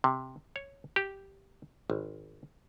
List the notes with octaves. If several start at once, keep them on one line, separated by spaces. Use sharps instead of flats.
C3
C#5
G4
G#1